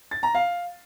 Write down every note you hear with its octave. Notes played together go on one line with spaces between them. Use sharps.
A6
A#5
F5